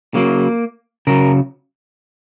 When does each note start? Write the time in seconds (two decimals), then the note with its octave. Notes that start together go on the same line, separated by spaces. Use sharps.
0.14 C#3 F#3 A#3
1.07 C#3 F#3 A#4